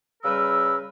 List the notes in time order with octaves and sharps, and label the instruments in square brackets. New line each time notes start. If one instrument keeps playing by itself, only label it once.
[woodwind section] C#3 G3 A#4 B4 E6